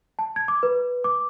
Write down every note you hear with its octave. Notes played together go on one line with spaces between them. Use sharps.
A5
G#6
D6
B4
D6